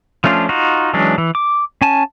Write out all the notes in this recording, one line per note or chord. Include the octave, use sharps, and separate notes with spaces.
F3 A3 C#4 D4 F4
D#4 F4 F#4
E3 F#3 G#3 C#4 D4
E3
D6
C#4 G#5 A5